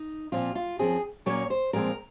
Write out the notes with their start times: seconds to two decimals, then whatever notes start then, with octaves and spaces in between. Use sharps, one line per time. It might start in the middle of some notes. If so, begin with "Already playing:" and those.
Already playing: D#4
0.32 A#2 F3 C4 F4
0.55 F4
0.79 F#2 F3 C4 G#4
1.26 A#2 F#3 A#3 C#4 C#5
1.50 C5
1.73 A#2 F3 G#3 C4 A#4